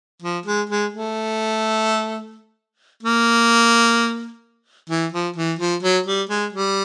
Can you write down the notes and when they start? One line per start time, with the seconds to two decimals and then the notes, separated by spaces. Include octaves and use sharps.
0.22 F3
0.46 G#3
0.70 G#3
0.93 A3
3.03 A#3
4.90 E3
5.12 F3
5.36 E3
5.59 F3
5.83 F#3
6.06 G3
6.29 G#3
6.53 G3